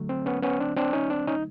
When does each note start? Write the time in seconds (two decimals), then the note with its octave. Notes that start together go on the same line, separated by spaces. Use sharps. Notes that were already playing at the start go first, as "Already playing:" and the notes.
Already playing: D3 F#3 A3
0.09 C4
0.26 B3 C#4
0.42 B3 C#4
0.60 C4 D4
0.77 C4 D4
0.93 C#4 D#4
1.10 C4 D4
1.27 C#4 D#4